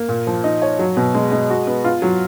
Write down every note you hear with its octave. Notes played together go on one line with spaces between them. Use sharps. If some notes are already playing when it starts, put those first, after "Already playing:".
Already playing: A#3
A#2
F3
D#4
C#5
F#3
B2
G#3
G#3
F#4
B3
F4
F#3